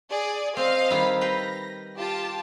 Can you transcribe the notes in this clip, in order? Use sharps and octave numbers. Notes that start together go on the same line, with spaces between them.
G#4 D5
C4 D#5 F5
D#3 G3 E4
B4 F5 G5 A#6
F4 G4 A5